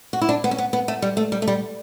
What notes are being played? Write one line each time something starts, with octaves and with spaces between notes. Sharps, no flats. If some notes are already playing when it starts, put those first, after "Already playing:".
F#4
E4
D4
B3
C#4
B3
B3
A3
G3
A3
G3
A3
G3